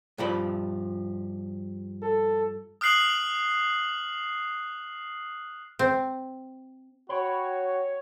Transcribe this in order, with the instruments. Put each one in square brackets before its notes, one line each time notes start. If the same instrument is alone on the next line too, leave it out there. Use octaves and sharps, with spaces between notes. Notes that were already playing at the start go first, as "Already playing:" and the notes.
[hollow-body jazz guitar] G2 F3 B5
[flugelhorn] A4
[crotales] D#6 F6 F#6 C7 F#7
[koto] C4
[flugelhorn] F#4 [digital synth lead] C#5 [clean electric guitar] G5 B5